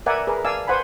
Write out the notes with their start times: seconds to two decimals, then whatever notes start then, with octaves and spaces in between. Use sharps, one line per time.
0.06 A#4 B4 D5 E5 F#5 G#5
0.27 G#4 A#4 B4
0.45 D5 F5 G#5 A5 E6
0.68 B4 C5 F#5 G#5 B5